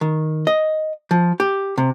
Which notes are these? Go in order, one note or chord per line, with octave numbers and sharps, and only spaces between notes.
D#3
D#5
F3
G4
C3